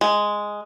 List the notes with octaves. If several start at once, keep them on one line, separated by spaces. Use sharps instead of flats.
G#3